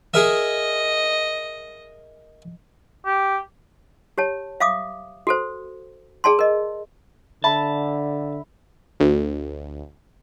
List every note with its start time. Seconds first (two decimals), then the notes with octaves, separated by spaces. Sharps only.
0.14 G#4 A#4 D#5 E5
3.05 G4
4.18 G4 C#5 A5
4.60 E5 F5 D6 D#6
5.27 F#4 A4 C5
6.24 G#4 D5 A5 C6
6.39 A#4 D#5
7.44 D3 E5 A5 B5
9.00 D2